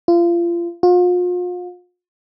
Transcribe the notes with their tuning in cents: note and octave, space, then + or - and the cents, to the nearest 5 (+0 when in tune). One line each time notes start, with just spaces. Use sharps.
F4 -30
F4 +40